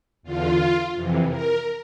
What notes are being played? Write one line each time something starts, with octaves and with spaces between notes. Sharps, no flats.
E2 D3 F4
F2 C3 E3
A#4